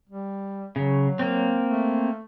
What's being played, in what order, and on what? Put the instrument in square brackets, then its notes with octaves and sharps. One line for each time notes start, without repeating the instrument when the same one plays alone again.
[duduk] G3
[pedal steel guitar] C#3 [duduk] F#3
[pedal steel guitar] A#3 C4
[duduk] A3